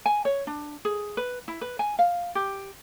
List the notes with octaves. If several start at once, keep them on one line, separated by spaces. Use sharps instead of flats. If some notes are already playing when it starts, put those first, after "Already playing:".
G#5
C#5
D4
G#4
B4
E4
B4
G#5
F5
G4